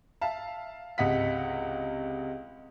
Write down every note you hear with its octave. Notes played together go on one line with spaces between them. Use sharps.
E5 F5 A5
C#2 C3 D#5 F#5 B6